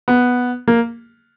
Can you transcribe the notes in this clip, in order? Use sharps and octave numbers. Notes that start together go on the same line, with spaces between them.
B3
A#3